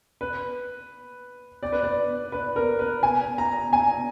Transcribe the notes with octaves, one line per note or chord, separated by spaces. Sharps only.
B4
D5
B4
D5
B4
A#4
B4
G#5
A#5
G#5